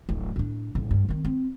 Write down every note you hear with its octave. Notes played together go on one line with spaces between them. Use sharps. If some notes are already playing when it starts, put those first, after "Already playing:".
D1 A1
A2 D4
D#1 A1
G2
D#3 C4
C4